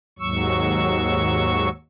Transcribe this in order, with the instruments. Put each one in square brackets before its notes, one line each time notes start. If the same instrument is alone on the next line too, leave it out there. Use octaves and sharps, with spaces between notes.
[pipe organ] D#2 G#2 F#3 C#6 E6